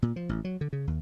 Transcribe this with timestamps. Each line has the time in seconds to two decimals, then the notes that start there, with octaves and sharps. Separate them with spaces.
0.02 A#2
0.16 F3
0.29 A1
0.45 F#3
0.61 D3
0.73 C#3
0.87 D#2